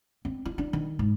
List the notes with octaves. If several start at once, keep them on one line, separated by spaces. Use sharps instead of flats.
C4
E4
D4
D#3
G#2